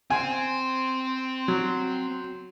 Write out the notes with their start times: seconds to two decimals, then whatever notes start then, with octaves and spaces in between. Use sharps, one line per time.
0.10 C4 C5 G#5
1.48 F#3